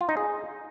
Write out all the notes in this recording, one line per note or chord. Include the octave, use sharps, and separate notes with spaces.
F4
D#4
G#4